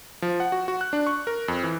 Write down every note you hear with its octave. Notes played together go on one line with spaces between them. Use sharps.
F3
F#5
F#4
F#4
F#6
D4
C#6
A#4
F2
E3